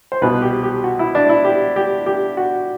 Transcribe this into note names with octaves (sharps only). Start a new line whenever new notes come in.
C5
C2 B2 B4
G4
G4
F#4
E4
D4
E4
G4
G4
G4
F#4